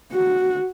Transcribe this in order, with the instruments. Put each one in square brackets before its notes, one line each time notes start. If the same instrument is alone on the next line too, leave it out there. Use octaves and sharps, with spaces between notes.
[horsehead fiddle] F#4